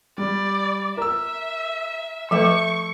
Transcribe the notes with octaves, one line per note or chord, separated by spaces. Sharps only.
G3 D5
A#4 E5 E6
F3 A3 B4 E5 G5 C#6